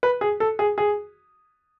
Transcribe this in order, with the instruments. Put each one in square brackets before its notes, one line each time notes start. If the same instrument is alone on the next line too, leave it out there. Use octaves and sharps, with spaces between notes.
[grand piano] B4
G#4
A4
G#4
G#4